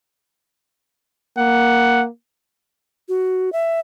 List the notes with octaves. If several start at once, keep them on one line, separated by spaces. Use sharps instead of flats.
A#3 F#5
F#4
E5